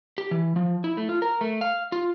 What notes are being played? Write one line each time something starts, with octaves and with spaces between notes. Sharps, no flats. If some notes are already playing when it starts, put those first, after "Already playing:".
G4
E3
F3
E4
A3
F4
A#4
A3
F5
F4